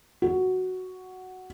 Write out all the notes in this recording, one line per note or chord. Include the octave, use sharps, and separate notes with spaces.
F#4